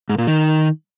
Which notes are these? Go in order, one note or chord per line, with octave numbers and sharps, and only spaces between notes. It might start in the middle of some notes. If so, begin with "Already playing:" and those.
G#2
A#2
D#3